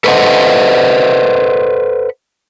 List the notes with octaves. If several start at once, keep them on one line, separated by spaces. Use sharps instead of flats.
A4 B4 C5 D#5 F#5